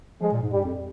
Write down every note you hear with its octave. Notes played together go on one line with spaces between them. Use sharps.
F3 G#3
A#2
G#2
G2 G3
F2